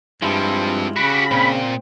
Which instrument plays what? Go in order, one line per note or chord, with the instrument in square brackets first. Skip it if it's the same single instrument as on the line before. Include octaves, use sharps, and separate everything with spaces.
[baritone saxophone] G2 [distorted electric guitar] F3 C4 [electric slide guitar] G#3 E4 F4
[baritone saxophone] C#3 [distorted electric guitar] F#4 G4 [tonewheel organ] B5
[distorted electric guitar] A#2 [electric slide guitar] C4